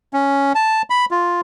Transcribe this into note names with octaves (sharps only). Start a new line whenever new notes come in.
C#4
A5
B5
F4